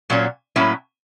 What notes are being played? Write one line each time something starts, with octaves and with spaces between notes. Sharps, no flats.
A#2 F#3 A#3 C#4
A2 F#3 A#3 C#4 E4